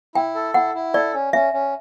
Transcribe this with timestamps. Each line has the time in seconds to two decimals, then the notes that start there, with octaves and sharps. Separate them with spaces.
0.15 E4 G5
0.35 A4
0.54 E4 F#5
0.74 E4
0.94 A4 D5
1.14 C#4
1.33 C#4 E5
1.53 C#4